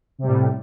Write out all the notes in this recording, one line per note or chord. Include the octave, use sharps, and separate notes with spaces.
A2 C3 G3